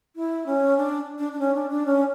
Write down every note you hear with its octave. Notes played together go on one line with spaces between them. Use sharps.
E4
C#4
D4
D4
D4
C#4
D4
D4
C#4